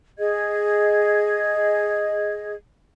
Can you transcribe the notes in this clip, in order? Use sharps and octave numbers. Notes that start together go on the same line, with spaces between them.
G#4 D#5 G#6